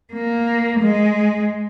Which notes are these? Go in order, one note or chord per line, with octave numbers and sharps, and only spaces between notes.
A#3
G#3